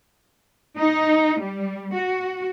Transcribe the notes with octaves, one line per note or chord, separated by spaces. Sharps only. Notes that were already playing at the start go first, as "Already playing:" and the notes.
D#4
G3
F#4